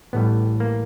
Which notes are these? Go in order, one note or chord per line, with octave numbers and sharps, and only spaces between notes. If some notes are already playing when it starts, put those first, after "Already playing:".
A1 A2 E3 G3 B3
A#3